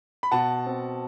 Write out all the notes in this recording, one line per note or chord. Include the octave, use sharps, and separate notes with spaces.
B5
B2 F#5 A5
C4